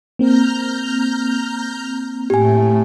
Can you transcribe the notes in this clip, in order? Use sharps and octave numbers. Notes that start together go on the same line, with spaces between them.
A#3 C4 A#5 F6 G6
A2 A3 G4 G#5